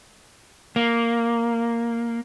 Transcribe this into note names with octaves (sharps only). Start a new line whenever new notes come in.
A#3